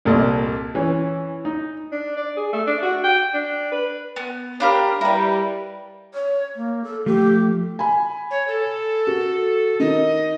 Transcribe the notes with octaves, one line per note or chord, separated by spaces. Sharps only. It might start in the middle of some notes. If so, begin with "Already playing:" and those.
C2 A#2 A4 D#5
E3 C#4
D#4
D4
D5
G#4
A3
D4
F#4
G5
D4
B4
B3
D4 G4 A#4 C#5 F5 B5
G3 E4 A#4 B4
C#5
A#3
A4
F3 A3 G4
G#5 B5
C#5
A4
F#4
D#3 D#5